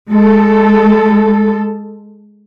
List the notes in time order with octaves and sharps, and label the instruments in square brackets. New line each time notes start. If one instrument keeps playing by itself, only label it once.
[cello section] G#3 A4